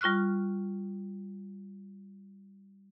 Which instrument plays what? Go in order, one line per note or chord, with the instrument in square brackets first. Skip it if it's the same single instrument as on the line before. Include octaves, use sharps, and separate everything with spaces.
[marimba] G3 F4 C#6 F6 F#6